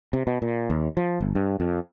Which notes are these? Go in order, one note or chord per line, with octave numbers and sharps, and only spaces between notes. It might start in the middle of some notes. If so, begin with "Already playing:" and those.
C3
B2
A#2
D#2
F3
G1
G2
F2